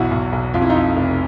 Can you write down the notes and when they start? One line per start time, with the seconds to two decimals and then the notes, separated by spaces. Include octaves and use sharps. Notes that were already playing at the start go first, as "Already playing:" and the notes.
Already playing: B1 E2 E4 F#4
0.11 B1
0.32 B1
0.54 F2 F4
0.62 E4
0.69 D#4 F4
0.76 F2
0.96 F1